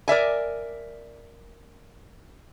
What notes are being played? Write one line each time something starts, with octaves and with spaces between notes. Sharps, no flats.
A#4 D5 E5 G#5